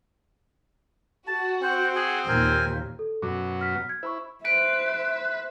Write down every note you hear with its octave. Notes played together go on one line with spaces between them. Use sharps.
F#4 A5
C4 C5 F#5
G#4 F#5 G#5
D#2 A#2 A#4 C5 G#5
A4
F#2 B2 F#3 D6
F6 B6
G#6
E4 C5 B5 C#6
B4 C5 E5 D7